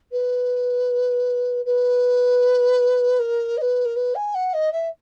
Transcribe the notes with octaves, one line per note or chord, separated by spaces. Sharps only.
B4
B4
A#4
D#5
B4
A#4
B4
G#5
F#5
D#5
E5